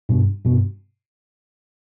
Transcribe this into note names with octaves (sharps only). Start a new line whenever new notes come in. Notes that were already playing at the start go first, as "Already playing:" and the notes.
G2 B2
G2 B2